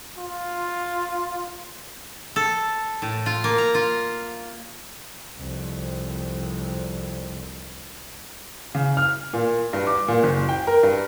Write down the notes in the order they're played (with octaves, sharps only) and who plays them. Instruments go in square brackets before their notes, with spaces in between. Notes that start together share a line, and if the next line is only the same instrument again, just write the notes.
[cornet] F4
[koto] A4
A2
F4
A#3
A#5
F4
[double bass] C2 F2
[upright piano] C#3
F6
A#2
G2
D6
A#2
F#1
G5
A#4
G2